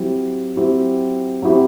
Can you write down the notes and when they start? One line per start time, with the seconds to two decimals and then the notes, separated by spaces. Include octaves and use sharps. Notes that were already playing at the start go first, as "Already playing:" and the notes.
Already playing: F#3 C4 E4 G4
0.56 F#3 C4 E4 G4
1.42 F#3 C4 E4 G4